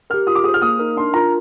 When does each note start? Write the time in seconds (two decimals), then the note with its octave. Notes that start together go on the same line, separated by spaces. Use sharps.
0.10 G4 A#4 F6
0.27 F4 D#6
0.35 D6
0.44 G#4 C5 D#6
0.54 F6
0.62 A#3 D#6
0.79 D#4 A#4
0.97 D4 C6
1.14 F4 A#4 A#5